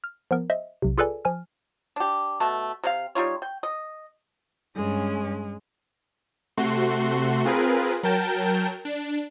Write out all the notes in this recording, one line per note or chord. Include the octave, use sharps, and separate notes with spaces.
F6
F3 B3 A#4
C5 D#5 E5
B1 C3
F4 G#4 A4 B4 D5 G#5
F3 G#5 F6
D4 G4
B2 A3 A5
C3 D#4 F5
G3 D#4 F4 C#5
G5
D#5
G2 G#3 C#4
C3 A3 F#4 C6
C4 F4 G#4 A#4 B4
F#3 A#4 G5 A5 G6
D4